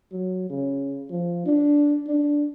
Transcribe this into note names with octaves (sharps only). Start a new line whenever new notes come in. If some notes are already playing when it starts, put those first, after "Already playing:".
F#3
C#3
F3
D4
D4